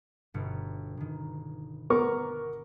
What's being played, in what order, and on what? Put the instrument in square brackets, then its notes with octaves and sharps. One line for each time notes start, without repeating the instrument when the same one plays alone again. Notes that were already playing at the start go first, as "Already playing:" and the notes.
[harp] G1 B2 C#7
G1 D#3
[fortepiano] B3 A#4 C#6 [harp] A#5 D6